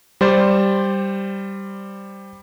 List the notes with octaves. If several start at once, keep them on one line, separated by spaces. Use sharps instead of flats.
G3 C5 D5